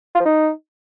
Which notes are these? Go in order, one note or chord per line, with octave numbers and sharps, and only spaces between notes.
F4
F3
D#4